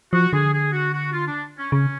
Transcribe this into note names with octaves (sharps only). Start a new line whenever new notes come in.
F3 F#4
D3 G#4
G#4
F#4
F#4
F4
D4
C#4
C#3 C#4